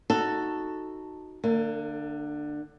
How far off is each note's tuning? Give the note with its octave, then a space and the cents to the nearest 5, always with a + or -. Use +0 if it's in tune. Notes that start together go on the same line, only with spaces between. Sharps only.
D#4 +0 F#4 +0 A4 +10
D3 +20 A#3 -35